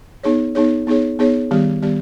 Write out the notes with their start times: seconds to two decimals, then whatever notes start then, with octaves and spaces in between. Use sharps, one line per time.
0.23 B3 D#4 G#4 C#5
0.55 B3 D#4 G#4 C#5
0.87 B3 D#4 G#4 C#5
1.19 B3 D#4 G#4 C#5
1.51 D#3 G3 B3 G4
1.82 D#3 G3 B3 G4